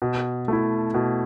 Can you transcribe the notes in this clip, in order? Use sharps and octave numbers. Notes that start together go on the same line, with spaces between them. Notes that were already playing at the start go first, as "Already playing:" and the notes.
B2
A3 E4
B2